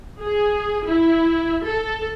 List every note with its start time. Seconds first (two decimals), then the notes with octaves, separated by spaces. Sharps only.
0.24 G#4
0.88 E4
1.66 A4